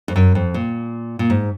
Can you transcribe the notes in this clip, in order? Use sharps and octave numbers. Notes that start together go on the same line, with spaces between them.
F2
F#2
F2
A#2
A#2
G#2